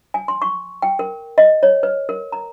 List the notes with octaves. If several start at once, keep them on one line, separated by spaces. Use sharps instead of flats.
G#5
C6
C#6
G5
A#4
D#5
C#5
B4
A#4
A#5